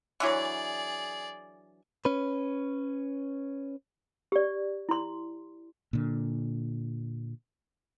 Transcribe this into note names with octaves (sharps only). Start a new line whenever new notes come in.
D3 E3 F#3 G#4 D5
C#4 B4
G4 D5
E4 C6
A#2 D3